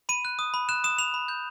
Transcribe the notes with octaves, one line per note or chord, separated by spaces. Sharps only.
B5 D#7
F#6
D#6
B5
F#6 E7
D#6 E7
B5 F7
B5
G6